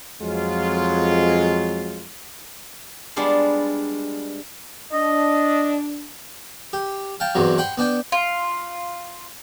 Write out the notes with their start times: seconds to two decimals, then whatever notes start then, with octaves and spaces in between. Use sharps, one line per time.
0.21 F2 F#3 G#3 F4
3.16 G3 G#3 B3 D4 F4
4.93 D4 D#5
6.73 G4
7.20 F5 G5 A5
7.35 E2 G2 C3 F#3
7.58 F#5 G5 B5 C6
7.78 B3 D4 G5
8.12 F4